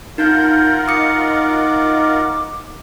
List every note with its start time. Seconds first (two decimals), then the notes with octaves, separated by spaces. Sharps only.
0.18 D#4 F4 A#4 F#5 G6
0.88 D#4 D6 D#6 C#7